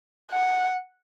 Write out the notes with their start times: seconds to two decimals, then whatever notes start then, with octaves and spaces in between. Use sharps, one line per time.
0.31 F#5